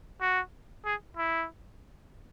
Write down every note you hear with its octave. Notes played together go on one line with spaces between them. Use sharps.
F#4
G#4
E4